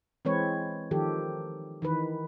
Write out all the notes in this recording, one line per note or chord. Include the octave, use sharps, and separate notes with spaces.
E3 G#3 C4 B4 C#5
D#3 F3 G4 A4
D#3 E3 B4